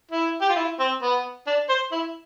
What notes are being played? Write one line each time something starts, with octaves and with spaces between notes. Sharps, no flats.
E4
G4
F4
E4
C4
B3
D4
C5
E4